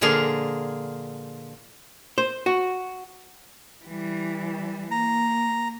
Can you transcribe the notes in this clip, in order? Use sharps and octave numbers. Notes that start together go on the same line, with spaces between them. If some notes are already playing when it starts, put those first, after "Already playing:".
A#2 D3 F3 A#3 G#4 F5
C5
F#4
E3 G3
A#3 A#5